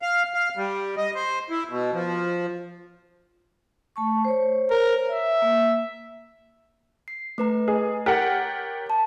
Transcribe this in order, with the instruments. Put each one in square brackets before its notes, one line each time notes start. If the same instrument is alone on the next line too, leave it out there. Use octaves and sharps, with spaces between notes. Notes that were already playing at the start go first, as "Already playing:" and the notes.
[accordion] F5
F5
G3
D#5
C5
E4
B2
F3
[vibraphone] A3 A5 C#6
C5 C#5
[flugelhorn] A#4
E5
[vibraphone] A#3
[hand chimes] C7
A3 B4 A#5
[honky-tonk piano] G#4 [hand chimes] D#5
[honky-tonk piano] G4 A#4 F#5 [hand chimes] C#5 A6
[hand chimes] A5